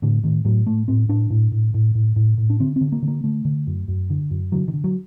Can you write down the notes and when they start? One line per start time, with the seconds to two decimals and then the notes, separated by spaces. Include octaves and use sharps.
0.02 A2 D3
0.24 A2 D#3
0.45 A2 F#3
0.66 A2 A3
0.88 A2 C4
1.09 A2 D4
1.30 A2
1.52 A2
1.74 A2
1.95 A2
2.16 A2
2.38 A2
2.50 D4
2.60 D3 C4
2.76 D3 C4
2.92 A#3
3.02 D3
3.08 A#3
3.24 D3 A3
3.45 D3
3.67 F#2
3.88 F#2
4.10 D3
4.31 F#2
4.52 D3 F#3
4.68 D#3
4.73 D3
4.84 F#3